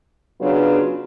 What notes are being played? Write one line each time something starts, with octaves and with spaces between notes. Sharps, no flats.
C#3 F#3 B3 D4 F4